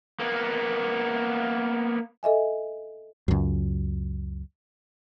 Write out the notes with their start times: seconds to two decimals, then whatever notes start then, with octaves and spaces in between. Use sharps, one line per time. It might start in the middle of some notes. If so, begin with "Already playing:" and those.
0.20 A#3 B3
2.23 A4 D#5 E5 G#5
3.28 C#2 F#2